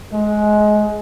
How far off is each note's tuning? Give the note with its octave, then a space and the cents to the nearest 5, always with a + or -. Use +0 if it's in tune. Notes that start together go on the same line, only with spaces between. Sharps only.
G#3 +20